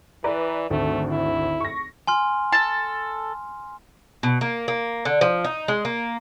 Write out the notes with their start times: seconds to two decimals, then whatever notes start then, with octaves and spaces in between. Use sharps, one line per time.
0.24 E3 B4 D5 A#5
0.70 G#1 D2 A3
1.11 E4
1.60 C#6 A#6
2.07 G#5 C6 F6
2.52 A4 A5
4.23 B2
4.41 A#3
4.68 A#3
5.05 D3
5.21 F3
5.44 D#4
5.68 G#3
5.85 A#3